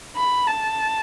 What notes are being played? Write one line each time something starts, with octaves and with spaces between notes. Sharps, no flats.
B5
A5